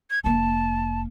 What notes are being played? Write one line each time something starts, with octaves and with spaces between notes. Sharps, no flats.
G#6
F1 A#3 A5